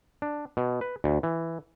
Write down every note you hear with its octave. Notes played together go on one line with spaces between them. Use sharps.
D4
B2
B4
D2
E3